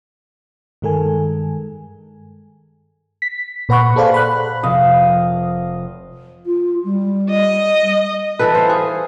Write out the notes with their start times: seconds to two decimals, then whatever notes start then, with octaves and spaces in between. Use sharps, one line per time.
0.82 G2 D#3 G#3 A4 A#4 G#5
3.22 B6
3.69 A#2 B4 F#5 B5 C#6 F#6
3.96 G#4 A4 C5 D5 F5
4.14 B5 F#6
4.63 F1 A#4 D#5 F5
6.46 F4
6.84 G3
7.29 D#5
8.39 E3 E4 A4 B4
8.55 C5 F5
8.69 G#4